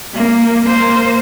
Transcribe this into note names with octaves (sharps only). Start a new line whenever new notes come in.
A#3
A#3 C5